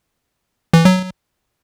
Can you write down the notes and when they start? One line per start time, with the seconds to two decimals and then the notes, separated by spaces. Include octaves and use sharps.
0.74 E3
0.85 F#3